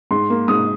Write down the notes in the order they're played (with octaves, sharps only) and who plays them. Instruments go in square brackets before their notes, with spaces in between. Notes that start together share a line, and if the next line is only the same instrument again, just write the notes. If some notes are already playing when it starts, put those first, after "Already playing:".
[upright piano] G#2 [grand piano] C6
[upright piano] A#3
[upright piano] G#2 [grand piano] D#6